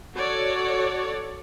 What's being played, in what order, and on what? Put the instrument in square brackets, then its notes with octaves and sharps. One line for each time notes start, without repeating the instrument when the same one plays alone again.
[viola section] F#4 A4 C#5 D5